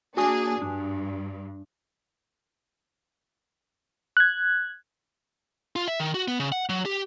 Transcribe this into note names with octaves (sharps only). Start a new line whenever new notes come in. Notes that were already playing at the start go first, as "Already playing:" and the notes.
A#3 D4 F#4 G#4 G#5 D#6
G2 D4
F#6 G#6
F4
E5
D#3
F#4
B3
C#3
F#5
F#3
G4